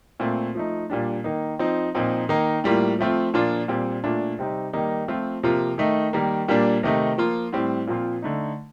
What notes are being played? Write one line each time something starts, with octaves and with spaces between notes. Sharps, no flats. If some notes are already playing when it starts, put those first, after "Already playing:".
A#2 A3 C4
F3 A3 D#4
A#2 G3 D4
D#3 A#3 D#4
F3 C4 D#4
A#2 F3 C4 D#4
D#3 A#3 D#4
A2 G3 A#3 F4
F3 A3 C4 F4
A#2 F3 A#3 D4 F4
A#2 G3 C4
A#2 A3 D4 F4
C3 G3 C4 D#4
D#3 G3 A#3 D#4
F3 A3 C4 F4
C3 F3 A#3 F4
D#3 A3 D#4
D#3 G3 A#3
A#2 G3 A#3 D4
C3 D#3 A3 D#4
F3 A#3 F4
A2 G3 C4
A#2 F3 C4 F4
D3 A3 D#4